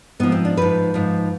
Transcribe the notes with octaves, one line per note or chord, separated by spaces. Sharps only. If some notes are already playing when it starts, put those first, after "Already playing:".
G#2 F3 B3
C4
D4
G#2 F3 B4
G#2 F3